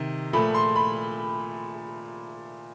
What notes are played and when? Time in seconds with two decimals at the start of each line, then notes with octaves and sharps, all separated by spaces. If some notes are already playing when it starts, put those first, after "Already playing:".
Already playing: C3 D#3
0.33 A#2 F3 A3 B5
0.54 C6
0.76 B5